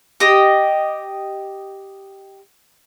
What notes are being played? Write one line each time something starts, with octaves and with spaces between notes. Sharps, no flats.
G4 D#5